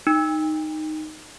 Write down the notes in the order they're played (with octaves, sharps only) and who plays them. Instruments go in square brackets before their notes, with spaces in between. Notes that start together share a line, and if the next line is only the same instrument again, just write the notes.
[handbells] D#4